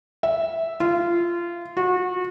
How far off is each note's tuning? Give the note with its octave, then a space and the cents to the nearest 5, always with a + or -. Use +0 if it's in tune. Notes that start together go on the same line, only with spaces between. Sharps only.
E5 -5
F4 -20
F#4 -30